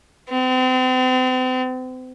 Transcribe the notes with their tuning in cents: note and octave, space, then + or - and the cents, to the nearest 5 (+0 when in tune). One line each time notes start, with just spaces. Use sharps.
C4 -40